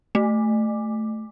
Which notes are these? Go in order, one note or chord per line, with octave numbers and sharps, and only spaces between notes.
A3